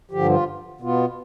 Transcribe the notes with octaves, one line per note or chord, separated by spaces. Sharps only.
G2 D3 F3 G4
F4
B2 B3 F4